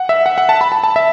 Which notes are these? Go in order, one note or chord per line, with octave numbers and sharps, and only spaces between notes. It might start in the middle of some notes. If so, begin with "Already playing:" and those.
Already playing: F#5
E5
F#5
F#5
A5
B5
A5
A5
E5